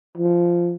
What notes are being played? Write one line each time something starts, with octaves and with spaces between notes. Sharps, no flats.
F3